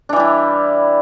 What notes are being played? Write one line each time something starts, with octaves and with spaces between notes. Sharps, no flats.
E3 G3 D4 E4